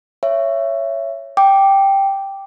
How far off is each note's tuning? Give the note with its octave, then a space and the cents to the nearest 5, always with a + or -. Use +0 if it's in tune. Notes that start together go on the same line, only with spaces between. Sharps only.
C#5 +0 E5 +20
G5 +0 D6 +0